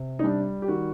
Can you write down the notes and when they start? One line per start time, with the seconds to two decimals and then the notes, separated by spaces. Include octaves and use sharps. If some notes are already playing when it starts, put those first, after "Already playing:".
Already playing: C3
0.19 D#4
0.23 G3 D4
0.62 G4
0.68 D#3 F#4